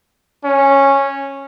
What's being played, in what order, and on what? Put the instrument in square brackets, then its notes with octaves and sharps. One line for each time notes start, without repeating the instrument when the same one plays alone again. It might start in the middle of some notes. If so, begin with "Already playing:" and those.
[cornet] C#4